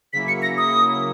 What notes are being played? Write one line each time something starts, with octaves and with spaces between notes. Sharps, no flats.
C#3 F#3 A#3 E4 B6
C#7
A#6
D#6